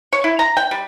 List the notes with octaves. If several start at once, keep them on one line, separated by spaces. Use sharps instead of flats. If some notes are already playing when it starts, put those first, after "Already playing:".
C#5
E4
A#5
G5
G3